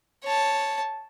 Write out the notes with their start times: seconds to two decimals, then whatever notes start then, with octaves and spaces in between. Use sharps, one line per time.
0.23 C#5 A5